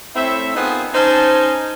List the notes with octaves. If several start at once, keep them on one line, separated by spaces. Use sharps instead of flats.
A3 C4 E4 C#5 E5
B3 C4 D#4 F4 G#4 A#4
C#4 D#4 C5 G#5 A5